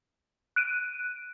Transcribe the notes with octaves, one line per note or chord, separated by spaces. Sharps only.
F#6 D7 D#7